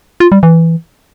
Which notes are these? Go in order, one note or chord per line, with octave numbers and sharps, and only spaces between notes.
F4
G3
E3